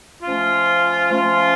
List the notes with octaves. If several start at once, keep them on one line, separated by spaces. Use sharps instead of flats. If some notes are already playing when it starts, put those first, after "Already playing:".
F3 A3 C#4 F4
F3 A3 C#4 F4